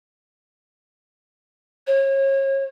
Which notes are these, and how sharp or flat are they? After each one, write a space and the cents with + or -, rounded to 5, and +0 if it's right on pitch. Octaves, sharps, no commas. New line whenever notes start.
C#5 -35